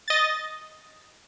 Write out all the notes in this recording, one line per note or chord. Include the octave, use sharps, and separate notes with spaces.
D#5 A6